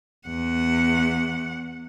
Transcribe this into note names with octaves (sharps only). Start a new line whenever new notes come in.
E2 F#5